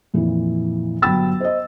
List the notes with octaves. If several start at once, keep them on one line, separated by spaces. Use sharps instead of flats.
F2 A#2 E3
G1 F#3 G5 B5 E6 A6
C5 D#5